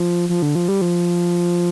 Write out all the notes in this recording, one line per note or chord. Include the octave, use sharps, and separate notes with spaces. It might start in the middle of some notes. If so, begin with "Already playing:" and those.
Already playing: F3
F3
D3
F3
G3
F3